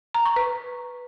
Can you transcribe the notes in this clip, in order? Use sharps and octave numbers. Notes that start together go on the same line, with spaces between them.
A#5
C#6
B4